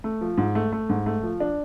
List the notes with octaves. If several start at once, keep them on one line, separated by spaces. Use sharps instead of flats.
A3
F3
G#2
A3
A3
G#2
A3
F3
D4